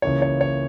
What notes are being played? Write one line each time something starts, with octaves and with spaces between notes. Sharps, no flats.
C#2 C#3 E3 A#3 C#5
C#5
C#5